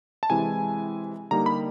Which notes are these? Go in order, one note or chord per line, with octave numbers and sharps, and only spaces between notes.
A5
C3 E3 G#3 C4 E4 G#5
D3 G3 A#3 D#4 A#5
B5